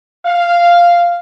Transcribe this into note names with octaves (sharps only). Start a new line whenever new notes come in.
F5